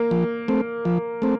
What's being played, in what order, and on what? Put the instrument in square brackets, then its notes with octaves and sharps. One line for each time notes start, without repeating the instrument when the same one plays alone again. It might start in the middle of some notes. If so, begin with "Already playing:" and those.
Already playing: [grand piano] A#3
[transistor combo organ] F3
A3 C4
F3
A3 C4